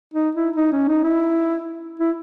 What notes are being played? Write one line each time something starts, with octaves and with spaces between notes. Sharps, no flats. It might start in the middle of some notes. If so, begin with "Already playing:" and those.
D#4
E4
D#4
C#4
D#4
E4
E4